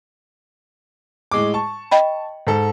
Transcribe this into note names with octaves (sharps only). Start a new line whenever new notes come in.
A2 G#3 D6
A5 C#6
D#5 G5 B5
G#2 A4